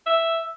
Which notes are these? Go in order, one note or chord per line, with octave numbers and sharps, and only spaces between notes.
E5